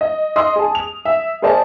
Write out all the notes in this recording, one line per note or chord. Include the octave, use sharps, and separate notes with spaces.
D#5
D#5 C6 D#6
G#4 A5
F7
E5
G#4 A#4 C5 D5 D#5 A5